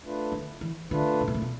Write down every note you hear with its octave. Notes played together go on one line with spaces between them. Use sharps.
A3 D4 F4 B4
D3
E3
D3 A3 D4 F4 B4
C3
B2
A2
B2